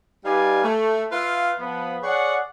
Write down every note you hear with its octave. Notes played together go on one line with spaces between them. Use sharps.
G3 D#4 B4 D5 F5 G#5
A3
F4 B4 E5 F5
F3 B3 B4
G#4 C#5 D5 F#5